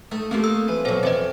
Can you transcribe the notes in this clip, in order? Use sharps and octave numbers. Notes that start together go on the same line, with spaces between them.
A3 D#4 A4
A3 A#3 C4 D#4 G4 A4
D#4 E6
E3 F3 B4
B2 F#3 A4 C5
F2 E3 C4 C5 D#5 G5